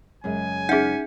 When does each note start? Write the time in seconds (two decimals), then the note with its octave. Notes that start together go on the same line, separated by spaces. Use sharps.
0.24 F#2 C#3 G#3 G#5
0.69 C#4 D#4 G#4 E5 F#5